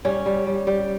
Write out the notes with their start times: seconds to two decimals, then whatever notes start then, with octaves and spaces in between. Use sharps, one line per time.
0.05 G3 C#4
0.26 G3
0.47 G3
0.67 G3